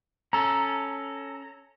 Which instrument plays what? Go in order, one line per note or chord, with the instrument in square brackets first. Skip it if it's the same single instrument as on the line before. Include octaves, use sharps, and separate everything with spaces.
[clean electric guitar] C#4 A4 [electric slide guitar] A#5